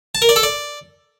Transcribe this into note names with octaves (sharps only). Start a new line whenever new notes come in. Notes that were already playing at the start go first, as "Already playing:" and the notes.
A5
A#4
D5
A4
D5